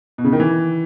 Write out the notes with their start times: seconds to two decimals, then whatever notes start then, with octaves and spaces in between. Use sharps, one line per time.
0.18 B2
0.24 C#3
0.33 D#3
0.40 E3